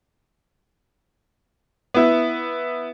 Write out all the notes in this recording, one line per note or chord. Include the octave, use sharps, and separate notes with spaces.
B3 E4